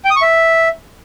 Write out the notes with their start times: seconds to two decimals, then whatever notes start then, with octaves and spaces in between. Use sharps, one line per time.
0.05 G5
0.10 D#6
0.16 C#6
0.22 E5